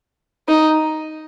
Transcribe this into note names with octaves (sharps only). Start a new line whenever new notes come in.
D#4